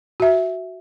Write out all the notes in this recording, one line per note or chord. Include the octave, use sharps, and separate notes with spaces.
F#4 E5